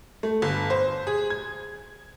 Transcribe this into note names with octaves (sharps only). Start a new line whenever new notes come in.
A3
G1
C5
G#4
G#6